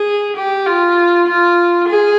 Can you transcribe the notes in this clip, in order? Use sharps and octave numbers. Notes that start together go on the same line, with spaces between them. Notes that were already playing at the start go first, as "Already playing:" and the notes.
Already playing: G#4
G4
F4
F4
G#4